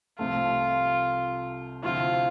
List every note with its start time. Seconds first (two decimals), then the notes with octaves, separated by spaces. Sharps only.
0.19 C2 C3 F3 A3 F4
1.83 D2 C3 F3 C4 E4 F4